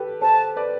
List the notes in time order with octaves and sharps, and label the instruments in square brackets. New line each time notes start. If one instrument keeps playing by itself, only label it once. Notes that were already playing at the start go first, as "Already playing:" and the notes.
Already playing: [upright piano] G4 A4 B4
[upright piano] A4 C5 [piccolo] A5
[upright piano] B4 D5